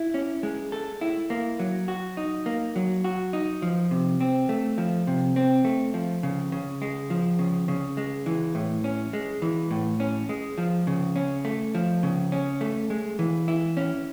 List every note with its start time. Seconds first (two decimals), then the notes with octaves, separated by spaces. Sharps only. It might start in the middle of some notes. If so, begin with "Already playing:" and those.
Already playing: E4
0.14 C#4
0.43 G#3
0.72 A4
1.01 E4
1.30 A#3
1.60 F#3
1.88 F#4
2.17 D#4
2.46 A#3
2.76 F#3
3.04 F#4
3.33 D#4
3.62 F3
3.91 C3
4.21 C4
4.49 A3
4.78 F3
5.07 C3
5.36 C4
5.65 A3
5.94 F3
6.23 C#3
6.52 C#3
6.82 G#3
7.10 F3
7.39 C#3
7.68 C#3
7.97 G#3
8.26 E3
8.55 A2
8.84 C#4
9.13 G#3
9.42 E3
9.71 A2
10.00 C#4
10.29 G#3
10.58 F3
10.87 C#3
11.16 C#4
11.45 A3
11.74 F3
12.03 C#3
12.32 C#4
12.61 A3
12.90 G#3
13.19 E3
13.48 E4
13.77 C#4